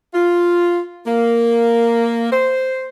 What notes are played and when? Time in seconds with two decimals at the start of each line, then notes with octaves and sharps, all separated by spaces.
0.14 F4
1.06 A#3
2.32 C5